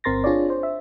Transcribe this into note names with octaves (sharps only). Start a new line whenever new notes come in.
G1 C4 A#4 C6 A6 A#6
D4 F4 G#4 C#5 D5
C5
E5